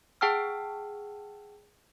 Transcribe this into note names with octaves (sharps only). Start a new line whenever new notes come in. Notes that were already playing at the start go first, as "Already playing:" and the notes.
G#4 F#5 G5 A5 E6 F6